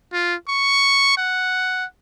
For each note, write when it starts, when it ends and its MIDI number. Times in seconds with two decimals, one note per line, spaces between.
0.13 0.35 65
0.48 1.16 85
1.17 1.85 78